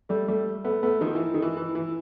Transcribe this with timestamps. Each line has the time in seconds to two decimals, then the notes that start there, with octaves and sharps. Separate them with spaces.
0.09 G3 A3
0.28 G3 A3
0.65 A3 B3
0.83 A3 B3
1.01 D#3 F3
1.15 E3
1.34 D#3
1.42 E3
1.57 E3
1.75 E3